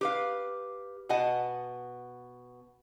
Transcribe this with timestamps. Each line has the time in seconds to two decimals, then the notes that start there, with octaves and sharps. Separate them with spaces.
0.01 G4 B4 F5
1.09 B2 B3 D#5 F#5 G#5 A5